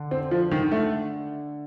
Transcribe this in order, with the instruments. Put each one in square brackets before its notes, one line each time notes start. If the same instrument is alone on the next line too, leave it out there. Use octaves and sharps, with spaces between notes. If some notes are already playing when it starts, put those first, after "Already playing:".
Already playing: [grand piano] D3
[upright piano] C4
F3
D#3
A3